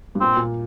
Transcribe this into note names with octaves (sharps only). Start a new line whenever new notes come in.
G2
A#2 C4
A#2